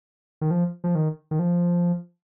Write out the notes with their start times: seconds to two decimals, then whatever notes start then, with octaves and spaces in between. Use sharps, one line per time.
0.41 D#3
0.51 F3
0.84 F3
0.95 D#3
1.31 D#3
1.39 F3